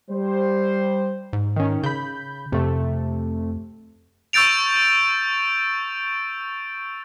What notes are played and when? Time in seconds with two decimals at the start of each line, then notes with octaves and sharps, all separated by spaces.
0.11 G3 C5
1.33 G#2
1.56 D#3 C#4
1.83 C#3 B5 G6
2.52 F2 C3 A3
4.33 C#6 E6 G6 A6 D7 F7